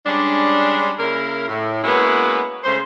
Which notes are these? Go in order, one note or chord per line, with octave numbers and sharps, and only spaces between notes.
G3 G#3 C#4 D4
C#3 A#3 E4 A#4
A2
G#3 A#3 B3 C#4 E4 F#4
C#3 G#3 A3 C5